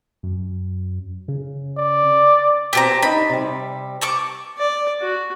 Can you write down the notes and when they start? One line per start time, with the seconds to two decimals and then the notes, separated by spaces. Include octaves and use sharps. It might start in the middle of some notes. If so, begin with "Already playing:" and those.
0.23 F#2
1.28 C#3
1.78 D5
2.73 B2 C4 G4 A5 A#5
3.03 D4 D#4 B5
3.29 C3 G3
4.01 A5 C#6 D6
4.58 D5
5.01 F#4